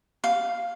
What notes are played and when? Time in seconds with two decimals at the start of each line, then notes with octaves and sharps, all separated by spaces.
0.24 F5